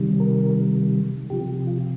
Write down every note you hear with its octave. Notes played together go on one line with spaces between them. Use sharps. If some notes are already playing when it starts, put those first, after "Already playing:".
Already playing: C3 D#3 G3
A#4
C3 F3 G4
F4